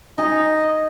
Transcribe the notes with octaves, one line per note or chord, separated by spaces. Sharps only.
D#4 G#4 D#5